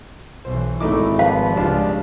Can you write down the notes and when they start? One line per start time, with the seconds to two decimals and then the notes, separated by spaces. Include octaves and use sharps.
0.45 B1 E3 C5
0.80 G#1 A3 D#4 E4 D6
1.19 F3 B4 F5
1.55 C#2 G3 D4 F4